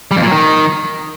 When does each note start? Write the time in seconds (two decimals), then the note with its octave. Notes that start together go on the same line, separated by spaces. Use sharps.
0.11 G3
0.17 F2
0.22 A#2
0.27 F#3
0.32 D#3